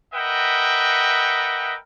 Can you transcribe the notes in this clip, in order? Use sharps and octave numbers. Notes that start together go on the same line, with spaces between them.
A#4 B4 D#5 E5 F#5 G5